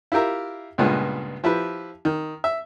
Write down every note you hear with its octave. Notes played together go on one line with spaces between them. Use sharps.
E4 F4 G4 A#4 E5
C#2 G2 A#2 G#3 B3
F3 E4 G4 B4
D#3
E5